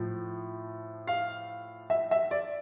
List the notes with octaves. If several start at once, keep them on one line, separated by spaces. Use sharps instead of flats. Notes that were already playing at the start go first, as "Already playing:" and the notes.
Already playing: A2 F3
F5
E5
E5
D5